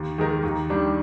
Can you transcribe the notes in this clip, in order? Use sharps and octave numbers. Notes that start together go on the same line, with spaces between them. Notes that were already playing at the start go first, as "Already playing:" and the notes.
Already playing: D#2
D#3 G#3 D#4 A#4
D#2
D#3 G3 D4